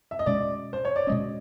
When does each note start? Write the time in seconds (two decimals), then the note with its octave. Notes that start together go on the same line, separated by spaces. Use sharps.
0.11 E5
0.19 D#5
0.26 B2 G#3 C#4 D5
0.73 C5
0.85 C#5
0.96 D5
1.07 B2 G#3 C#4 D#5